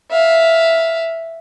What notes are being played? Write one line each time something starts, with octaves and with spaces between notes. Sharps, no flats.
E5 F5